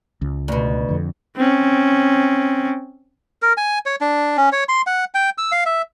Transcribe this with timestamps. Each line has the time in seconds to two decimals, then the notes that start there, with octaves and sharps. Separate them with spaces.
0.22 C#2
0.48 D2 B2
0.89 F2 D3
1.37 C4 C#4
3.42 A#4
3.57 G#5
3.86 C#5
4.01 D4
4.37 C#4
4.52 C#5
4.69 C6
4.87 F#5
5.14 G5
5.38 E6
5.52 F5
5.66 E5